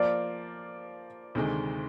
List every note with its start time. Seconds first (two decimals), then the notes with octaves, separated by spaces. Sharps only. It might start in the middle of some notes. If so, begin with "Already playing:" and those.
Already playing: F3 A#3 F4 A#4 D5
1.35 D2 C3 D#3 G#3